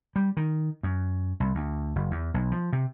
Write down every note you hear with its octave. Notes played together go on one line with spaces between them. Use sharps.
G3
D#3
F#2
C2
D2
F#1
E2
B1
F3
C3